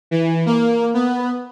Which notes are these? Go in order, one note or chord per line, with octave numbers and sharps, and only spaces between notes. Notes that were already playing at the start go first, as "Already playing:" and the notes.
E3
A#3
B3